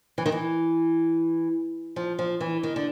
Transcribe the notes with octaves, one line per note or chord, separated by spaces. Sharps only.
E3
D#3
E3
F3
F3
E3
D#3
D3